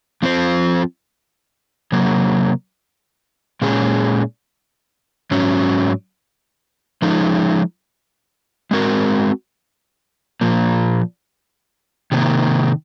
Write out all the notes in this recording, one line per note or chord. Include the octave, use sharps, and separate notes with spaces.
F3 C4 F4 C5
C3 F#3 A#3
A#2 G#3 C#4 G#4
G#2 F#3 C#4
F3 G#3 D#4
G#3 C4 F#4 A#4
A#2 F3 A#3
C3 D#3 A#3